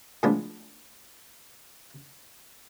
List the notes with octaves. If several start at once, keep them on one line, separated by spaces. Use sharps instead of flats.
A2 F3 G#3 B3 D4